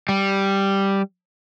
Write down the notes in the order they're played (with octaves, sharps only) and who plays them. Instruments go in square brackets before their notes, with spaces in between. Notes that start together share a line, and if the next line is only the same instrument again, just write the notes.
[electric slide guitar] G3